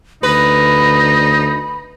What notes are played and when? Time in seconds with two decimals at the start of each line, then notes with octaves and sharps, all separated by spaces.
0.23 D2 D#4 B4 B5